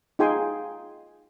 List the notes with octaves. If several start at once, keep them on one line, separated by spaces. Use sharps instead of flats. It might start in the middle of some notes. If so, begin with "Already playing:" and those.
D#4 F4 G#4 G5 G#5 C6